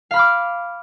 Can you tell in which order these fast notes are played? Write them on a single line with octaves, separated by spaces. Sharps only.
F5 B5 F6 D6